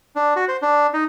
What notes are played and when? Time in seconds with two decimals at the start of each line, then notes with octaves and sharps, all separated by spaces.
0.16 D4
0.36 F#4
0.48 C5
0.62 D4
0.93 D#4